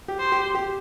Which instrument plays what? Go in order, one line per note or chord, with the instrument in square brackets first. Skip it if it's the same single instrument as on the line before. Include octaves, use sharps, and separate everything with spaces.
[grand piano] G4
[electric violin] C5
[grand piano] G4
G4